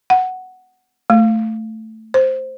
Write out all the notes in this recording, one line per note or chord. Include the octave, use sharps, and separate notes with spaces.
F#5
A3
C5